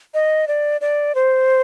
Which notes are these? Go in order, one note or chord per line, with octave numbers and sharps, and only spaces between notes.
D#5
D5
D5
C5